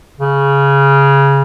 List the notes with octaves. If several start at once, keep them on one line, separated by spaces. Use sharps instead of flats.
C#3